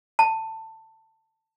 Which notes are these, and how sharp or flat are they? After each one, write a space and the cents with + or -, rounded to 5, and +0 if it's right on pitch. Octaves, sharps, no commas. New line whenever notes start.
A5 +15